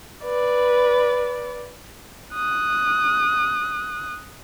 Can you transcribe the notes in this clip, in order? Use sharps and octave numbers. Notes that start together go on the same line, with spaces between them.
B4 D5
D#6 F#6